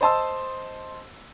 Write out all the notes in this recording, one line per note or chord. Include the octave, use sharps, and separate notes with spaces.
C5 D#5 A5 C6 E6